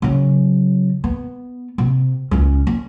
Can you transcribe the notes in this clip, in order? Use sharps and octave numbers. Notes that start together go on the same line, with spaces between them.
C#3 F#3
B3
C3
C#2 C#4
C#4